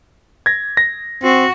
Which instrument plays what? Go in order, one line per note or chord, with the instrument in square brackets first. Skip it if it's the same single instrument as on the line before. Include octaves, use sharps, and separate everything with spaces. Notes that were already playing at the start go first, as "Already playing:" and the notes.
[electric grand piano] G#6 A#6
A#6
[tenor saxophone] C4 [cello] F#4